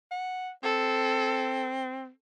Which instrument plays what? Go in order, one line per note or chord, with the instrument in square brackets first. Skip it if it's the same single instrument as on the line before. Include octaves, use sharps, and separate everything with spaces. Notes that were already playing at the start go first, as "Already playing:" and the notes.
[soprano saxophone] F#5
[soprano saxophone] C4 [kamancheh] A4